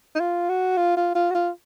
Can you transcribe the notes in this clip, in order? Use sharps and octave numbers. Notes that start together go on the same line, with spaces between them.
D#4
F4
F#4
F4
F4
F4
F#4
F4